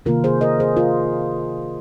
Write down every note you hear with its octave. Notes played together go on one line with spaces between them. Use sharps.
C3 D#3 A#3 F4 A#4
G#4 C5
A#4 D#5
G#4 C5
F4 A#4